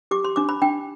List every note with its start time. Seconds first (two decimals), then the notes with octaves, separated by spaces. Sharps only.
0.11 G4 D6
0.24 C6
0.36 D4 D6
0.49 B5
0.62 D4 G5